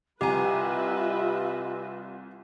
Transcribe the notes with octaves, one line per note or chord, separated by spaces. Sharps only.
C2 F4 G4 B4 D#5 E5 G#5 A#5